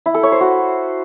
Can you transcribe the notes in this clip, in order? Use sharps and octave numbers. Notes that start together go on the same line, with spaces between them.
E4
A4
C#5
C5
F#4